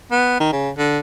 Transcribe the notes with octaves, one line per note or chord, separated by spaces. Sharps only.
B3
D#3
C#3
D3